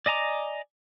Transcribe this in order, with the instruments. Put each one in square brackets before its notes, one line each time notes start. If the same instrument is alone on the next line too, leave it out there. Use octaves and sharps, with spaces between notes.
[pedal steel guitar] D5 D#5 G#5 A#5 D6